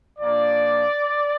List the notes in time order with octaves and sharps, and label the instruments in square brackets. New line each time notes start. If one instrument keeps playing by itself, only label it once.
[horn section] A#2 F3 A#3 D4 D5